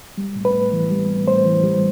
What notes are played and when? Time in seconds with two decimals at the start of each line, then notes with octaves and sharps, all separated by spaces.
0.17 G3
0.36 A2
0.45 B4
0.54 A2
0.73 E3
0.91 G3
1.09 A2
1.27 A2 C5
1.45 E3
1.63 G3